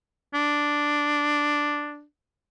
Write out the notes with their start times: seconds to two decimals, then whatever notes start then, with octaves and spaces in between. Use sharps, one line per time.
0.34 D4